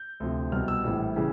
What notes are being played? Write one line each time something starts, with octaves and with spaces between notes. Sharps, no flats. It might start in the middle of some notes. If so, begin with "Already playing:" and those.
Already playing: G6
D2 C3 F3
C2 B2 G3 F6
E6
A#1 A2 E3 G3
C#3 E3 G3